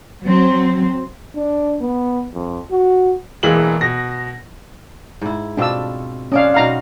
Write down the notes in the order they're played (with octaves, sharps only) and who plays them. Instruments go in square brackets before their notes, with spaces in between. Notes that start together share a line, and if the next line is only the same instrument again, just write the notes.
[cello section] F#3 C4
[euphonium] D4
B3
F2
F#4
[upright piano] E1 E3 G#3 A#3 F#7
B2 A#6
[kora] G#2 E4
[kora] B2 C4 F4 [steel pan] D4 E6
[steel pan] C#4 F5 [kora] D4 D5 D#5
[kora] B2 D#4 F#5 [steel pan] F5 A#5